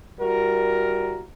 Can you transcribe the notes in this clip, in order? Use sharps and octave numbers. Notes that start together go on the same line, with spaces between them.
G3 E4 F#4 A#4